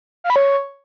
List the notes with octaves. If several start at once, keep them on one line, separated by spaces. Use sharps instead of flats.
F5
B5
C#5